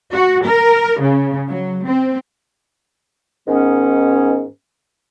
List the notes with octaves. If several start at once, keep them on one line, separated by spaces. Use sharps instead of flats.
F#4
A#4
C#3
F#3
C4
G#2 D#3 B3 C#4